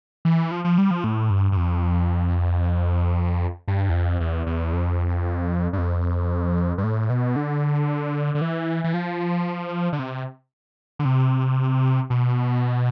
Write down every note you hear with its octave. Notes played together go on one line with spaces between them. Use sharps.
E3
F3
F3
G3
F3
A2
G2
G2
F2
G2
E2
F2
E2
E2
F2
G2
F2
G2
A2
B2
D3
D3
E3
E3
F3
D3
C3
D3
C3
B2